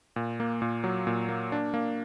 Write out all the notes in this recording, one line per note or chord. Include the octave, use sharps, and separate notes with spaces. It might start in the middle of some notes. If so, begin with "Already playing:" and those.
A#2
A#3
A#2
F#3
A#2
A#3
D4
A#3